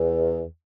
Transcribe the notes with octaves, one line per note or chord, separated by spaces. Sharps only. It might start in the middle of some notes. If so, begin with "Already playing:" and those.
Already playing: E2